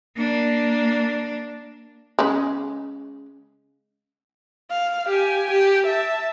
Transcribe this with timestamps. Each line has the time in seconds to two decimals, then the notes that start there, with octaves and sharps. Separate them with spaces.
0.17 A#3 D4
2.19 C#3 G#3
4.71 F5
5.08 G4 G#5
5.50 G4
5.86 E5 A5